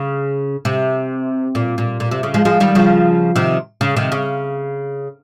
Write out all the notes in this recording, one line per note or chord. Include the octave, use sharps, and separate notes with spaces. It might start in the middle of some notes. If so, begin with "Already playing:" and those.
Already playing: C#3
C3
A#2
A#2
A#2
C3
C#3
F3 G#3
F3 G#3
D#3 G3
C#3 F3
C3 D#3
C#3
C3 D#3
C#3